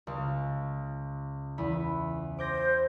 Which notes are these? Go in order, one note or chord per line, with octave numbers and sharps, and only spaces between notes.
C#2
E2 B5
C5 D6 G6 A#6